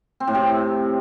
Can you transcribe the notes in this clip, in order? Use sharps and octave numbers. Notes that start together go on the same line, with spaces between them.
C4
A2
C3